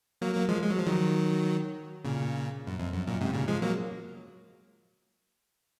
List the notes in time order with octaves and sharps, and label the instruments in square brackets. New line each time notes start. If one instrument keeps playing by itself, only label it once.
[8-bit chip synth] F#3 A#3
F#3 A#3
F3 G#3
G#3
F#3
F3
D#3 F#3
A#2 C#3
F#2
F2
F#2
F#2 A#2
G#2 C3
A#2 C#3
F3 G#3
F#3 A#3